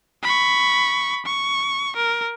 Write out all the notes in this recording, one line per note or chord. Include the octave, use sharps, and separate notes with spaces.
B5 C#6
C#6
A#4